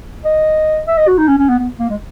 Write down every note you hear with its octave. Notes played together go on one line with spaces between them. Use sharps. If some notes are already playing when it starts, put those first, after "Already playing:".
D#5
E5
D#5
F#4
D#4
C#4
C#4
B3
B3
A#3
G#3